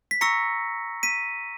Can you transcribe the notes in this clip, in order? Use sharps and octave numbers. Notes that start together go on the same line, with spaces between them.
B6
A#5 C#6 E6 A#6 C#7
B6 D#7